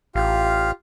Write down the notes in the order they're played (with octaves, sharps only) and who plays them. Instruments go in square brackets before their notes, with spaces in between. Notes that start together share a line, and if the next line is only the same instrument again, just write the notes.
[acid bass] A1 [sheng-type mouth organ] F4 G4 F5